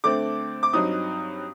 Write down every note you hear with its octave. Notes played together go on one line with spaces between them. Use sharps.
D3 A3 C4 D6
D6
G2 F#3 C4 D#4 D#6